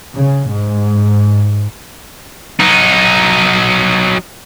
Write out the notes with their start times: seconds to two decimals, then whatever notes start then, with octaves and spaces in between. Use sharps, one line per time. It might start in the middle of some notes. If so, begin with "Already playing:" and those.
0.15 C#3
0.49 G#2
2.59 F#3 D#4